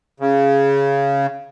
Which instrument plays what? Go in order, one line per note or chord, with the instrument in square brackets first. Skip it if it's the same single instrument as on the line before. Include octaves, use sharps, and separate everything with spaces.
[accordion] C#3